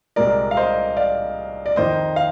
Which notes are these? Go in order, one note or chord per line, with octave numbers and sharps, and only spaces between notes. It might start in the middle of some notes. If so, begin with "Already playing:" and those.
C2 A#2 G#3 A#4 D5
F5
C5 D#5
D5 F5
D5
F2 D#3 A#3 C5 D#5
F5